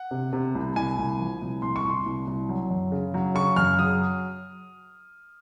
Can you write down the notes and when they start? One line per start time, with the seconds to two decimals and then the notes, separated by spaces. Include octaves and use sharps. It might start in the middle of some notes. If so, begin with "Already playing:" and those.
Already playing: F#5
0.11 C3
0.33 C3
0.55 C2
0.76 C2 G#5
0.98 C2
1.19 F3
1.42 C2
1.62 C2 C6
1.76 C#6
1.84 C2
1.90 C6
2.06 C2
2.27 C2
2.49 F#3
2.70 F#2
2.92 C#3
3.14 F#3
3.35 C#3 C#6
3.56 F#2 F6
3.79 F#3 D#6